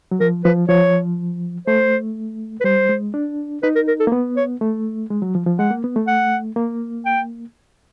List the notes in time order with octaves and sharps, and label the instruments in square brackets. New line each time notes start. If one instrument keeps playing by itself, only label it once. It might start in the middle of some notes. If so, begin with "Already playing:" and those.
[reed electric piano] F#3
[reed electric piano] F3 [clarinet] A#4
[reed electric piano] F3 [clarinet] B4
[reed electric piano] F3 [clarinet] C#5
[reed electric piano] A3 [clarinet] C5
[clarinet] B4
[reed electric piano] G3 [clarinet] C5
[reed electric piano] G#3
D4
[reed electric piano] D#4 [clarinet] B4
[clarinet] A#4
A#4
A4
[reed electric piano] A#3
B3
[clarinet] C#5
[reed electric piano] A3
G#3
F#3
F3
F3
[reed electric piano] G#3 [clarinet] F#5
[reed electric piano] A#3
B3
A3
[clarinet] F#5
[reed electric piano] A#3
[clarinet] G5